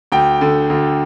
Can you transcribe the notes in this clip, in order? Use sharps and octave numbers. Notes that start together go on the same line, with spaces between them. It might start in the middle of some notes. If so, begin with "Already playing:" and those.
D2 G5
D3
D2